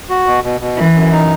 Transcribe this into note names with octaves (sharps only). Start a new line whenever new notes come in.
F#4
B2
B2
B2
F#2 E3
F#2
D#4